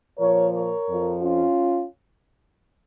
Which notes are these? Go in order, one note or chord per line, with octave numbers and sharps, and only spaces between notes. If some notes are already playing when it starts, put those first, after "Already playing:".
A#2 F3 A#4 C#5
A#4 C#5
F2 F3
C#4 F4